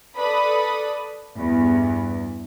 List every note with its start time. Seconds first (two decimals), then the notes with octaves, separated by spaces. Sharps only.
0.17 A4 B4 D5 B5 D#6
1.36 E2 G2